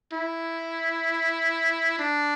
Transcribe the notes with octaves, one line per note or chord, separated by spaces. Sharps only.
E4
D4